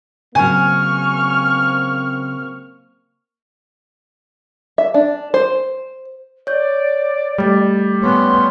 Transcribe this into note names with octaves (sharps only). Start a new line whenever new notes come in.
C#3 F#3 A#3 C4 G#5 C#6 F6
E5
D4
C5
C#5 D5 G6
G3 A3 A6
B3 C#4 C6